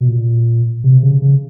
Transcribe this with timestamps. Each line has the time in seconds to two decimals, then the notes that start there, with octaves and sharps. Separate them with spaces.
0.01 B2
0.08 A#2
0.84 C3
1.03 C#3
1.22 C#3